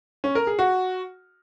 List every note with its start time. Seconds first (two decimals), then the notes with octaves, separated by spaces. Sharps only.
0.24 C#4
0.35 A#4
0.47 G#4
0.59 F#4